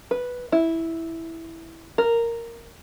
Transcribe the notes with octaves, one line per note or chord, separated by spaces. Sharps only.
B4
E4
A#4